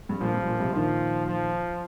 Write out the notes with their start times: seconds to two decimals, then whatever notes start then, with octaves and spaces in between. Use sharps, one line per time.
0.09 G2
0.20 A#2 F3
0.34 G2
0.47 A#2
0.60 G2 C3
0.73 A#2 D#3 F3
1.26 F3